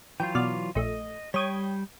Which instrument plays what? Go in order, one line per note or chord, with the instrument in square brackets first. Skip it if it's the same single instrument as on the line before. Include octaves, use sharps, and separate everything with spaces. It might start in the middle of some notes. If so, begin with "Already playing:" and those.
[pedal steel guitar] E3 F#3 F4 [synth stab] G5
[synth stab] B2 D5 F6
[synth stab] A#1 A3 [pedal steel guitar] D#5
[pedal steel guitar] G3 G5 [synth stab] C#5 D#6 G#6